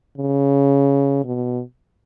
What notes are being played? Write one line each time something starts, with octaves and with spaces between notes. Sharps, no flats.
C#3
B2